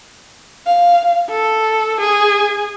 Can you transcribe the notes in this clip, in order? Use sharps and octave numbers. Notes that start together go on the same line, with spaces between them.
F5
A4
G#4